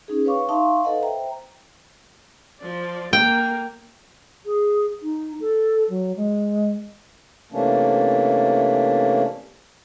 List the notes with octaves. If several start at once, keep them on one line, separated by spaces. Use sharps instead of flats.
C#4 D#4 G#4
B4 C#5 F5 C#6 D6
D#4 E5 F5 A5 C6 C#6
A4 B4 D#5 F5 F#5
C5 E5 G5 A#5
F3 D5
A#3 A#4 G5
G#4
D#4
A4
F#3
G#3
C3 E3 A3 A#3 C#4 D4